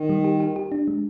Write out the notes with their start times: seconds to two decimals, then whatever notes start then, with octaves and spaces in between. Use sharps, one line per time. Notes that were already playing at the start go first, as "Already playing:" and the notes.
Already playing: D#3
0.09 G3
0.24 G4
0.40 G4
0.56 G4
0.72 D4
0.88 G#3